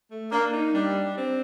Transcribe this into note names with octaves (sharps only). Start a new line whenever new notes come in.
A3
A#3 D4
D#4
G3 D4
C4